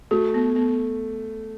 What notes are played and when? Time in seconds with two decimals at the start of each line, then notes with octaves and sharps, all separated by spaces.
0.11 A3 F#4
0.34 B3
0.56 B3